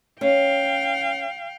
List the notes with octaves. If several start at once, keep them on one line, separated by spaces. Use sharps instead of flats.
C#4 F5 G5